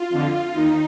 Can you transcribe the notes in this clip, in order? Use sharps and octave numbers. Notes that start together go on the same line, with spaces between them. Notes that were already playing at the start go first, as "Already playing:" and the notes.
Already playing: F4
F2 D3
D#2 D#3 D#4